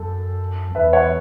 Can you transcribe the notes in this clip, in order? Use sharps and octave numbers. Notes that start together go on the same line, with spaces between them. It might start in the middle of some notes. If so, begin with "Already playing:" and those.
Already playing: F#2 A4
E2 B4 E5
C#5 F#5